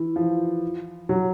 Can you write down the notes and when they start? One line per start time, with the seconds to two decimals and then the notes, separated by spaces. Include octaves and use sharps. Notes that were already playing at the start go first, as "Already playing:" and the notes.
Already playing: E3
0.16 F3
1.09 F#3